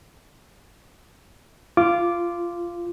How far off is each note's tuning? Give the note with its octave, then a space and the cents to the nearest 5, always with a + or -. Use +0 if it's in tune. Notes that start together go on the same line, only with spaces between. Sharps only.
F4 -15 D6 +0